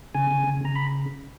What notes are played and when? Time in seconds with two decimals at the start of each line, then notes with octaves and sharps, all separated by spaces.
0.15 C#3 G#5
0.31 C#3
0.47 C#3
0.65 C#3 A#5
0.75 B5